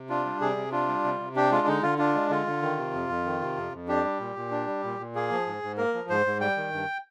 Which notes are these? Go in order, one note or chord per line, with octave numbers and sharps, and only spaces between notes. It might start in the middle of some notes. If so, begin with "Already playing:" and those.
Already playing: C3
D4 F4
G3
C3 G#4
C3
D4 F4
G3
C3
C3
D4 G4
G#3 F4
D3 D#4
D3 F4
D4 F4
G#3
D3 F4
D3
D#3
C3
F2
F2
D#3
C3
F2
F2
D4 G4
G3
A#2
A#2
D4
G3
A#2
A#2
A#3 G#4
F3
G#2
G#2
A#3 A#4
F3
G#2 C5
G#2
G3 G5
D#3
G2